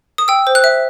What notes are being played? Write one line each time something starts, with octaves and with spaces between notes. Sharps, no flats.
D#6
G5 E6
C5
F#6
E5